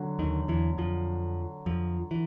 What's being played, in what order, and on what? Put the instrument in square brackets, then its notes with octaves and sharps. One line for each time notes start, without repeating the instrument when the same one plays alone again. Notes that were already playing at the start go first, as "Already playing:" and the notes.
Already playing: [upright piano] D3 F#3
[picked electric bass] D#2 D#3
E2 E3
F2 F3
F2 F3
E3